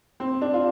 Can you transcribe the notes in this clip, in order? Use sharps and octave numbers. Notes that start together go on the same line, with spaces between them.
C4
D4
F4